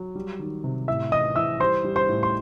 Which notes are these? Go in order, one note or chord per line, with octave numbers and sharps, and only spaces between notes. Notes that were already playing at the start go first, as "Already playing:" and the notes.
Already playing: F#3
G3
D#3
C3
A2 E5 E6
E3 D#5 D#6
E3 E5 E6
G3 C5 C6
G3
C5 C6
A2
C6